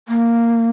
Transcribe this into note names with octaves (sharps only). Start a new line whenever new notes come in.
A#3